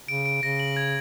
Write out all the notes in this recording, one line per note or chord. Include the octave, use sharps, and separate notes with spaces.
C#3 D7
D7
C#3 A#6
F#7
G#6